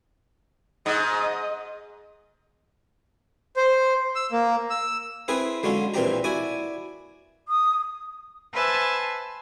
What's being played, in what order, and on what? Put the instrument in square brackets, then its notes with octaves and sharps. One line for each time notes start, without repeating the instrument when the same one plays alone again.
[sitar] G#2 [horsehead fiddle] D#5
[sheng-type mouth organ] C5
E6
A#3
E6
[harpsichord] C4 E4 G#4 A#4 B4
D3 F#3 G#3 C#4 F4
A#1 A#2 E3 C4 G4 A#5
E4 F#4 D5 G#5
[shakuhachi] D#6
[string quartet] B4 C5 E5 G#5 A5